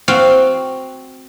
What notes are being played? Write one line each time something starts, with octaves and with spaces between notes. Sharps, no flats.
C4 F#4 F5